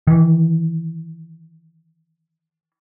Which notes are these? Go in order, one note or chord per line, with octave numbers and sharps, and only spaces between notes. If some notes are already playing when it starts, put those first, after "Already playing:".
D#3 E3